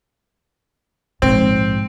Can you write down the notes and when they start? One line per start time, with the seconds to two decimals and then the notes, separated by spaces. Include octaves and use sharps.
1.22 A#1 G#2 C4